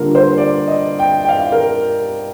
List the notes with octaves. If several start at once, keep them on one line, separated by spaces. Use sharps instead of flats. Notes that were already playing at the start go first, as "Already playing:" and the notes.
Already playing: D3 G3 A#3 F4 A#4
C5
D5
D#5
G5
G5
F5
A#4